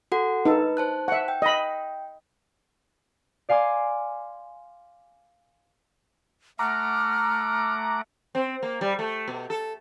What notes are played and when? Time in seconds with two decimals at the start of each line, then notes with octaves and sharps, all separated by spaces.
0.12 F#4 A4 F#5
0.45 D#4 A4 B4
0.77 C5 A5 F#6
1.08 E5 F#5
1.28 G5
1.42 D#5 B5
3.49 D5 F5 G#5 C6 D6
6.59 A3 F#5 A#5 D6 F6
8.35 C4
8.63 A#3
8.81 G3
8.99 A3
9.28 B2
9.50 A4